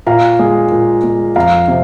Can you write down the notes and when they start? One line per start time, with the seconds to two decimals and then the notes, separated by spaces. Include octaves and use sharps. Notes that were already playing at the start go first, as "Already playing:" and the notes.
0.06 A#2 F5 A#5
0.39 G#3
0.72 A#2
1.04 G#3
1.36 F2 F5 A#5
1.68 C3